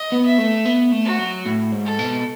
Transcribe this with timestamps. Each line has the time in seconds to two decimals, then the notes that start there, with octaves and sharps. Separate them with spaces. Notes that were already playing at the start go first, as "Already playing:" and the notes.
Already playing: D#5
0.12 B3
0.25 E5
0.38 A3
0.65 B3
0.92 A3
1.05 F#4
1.19 F#3
1.46 A2
1.72 G#2
1.85 A4
1.99 B2